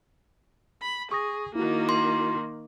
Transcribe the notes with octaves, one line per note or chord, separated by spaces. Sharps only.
B5
G#4 C#6 D#6 A#6
D#3 A#3 E4 F#4
C6